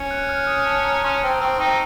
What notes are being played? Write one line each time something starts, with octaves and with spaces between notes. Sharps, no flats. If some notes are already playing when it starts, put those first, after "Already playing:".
Already playing: C#4
F#6
F#6
F6
D#6
A5
A#5
C#4 C6
C4
A#5
C4 C#6
C6
C4 D#4